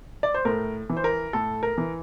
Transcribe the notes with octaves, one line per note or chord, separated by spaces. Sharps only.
D5
C5
A2 A#4
E3
C5
A#4
A2 A4
A#4
E3